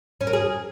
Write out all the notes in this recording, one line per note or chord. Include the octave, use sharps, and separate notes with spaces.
C#4
A#4
G#4